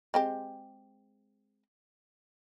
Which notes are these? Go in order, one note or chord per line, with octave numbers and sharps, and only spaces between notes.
G#3 C4 G4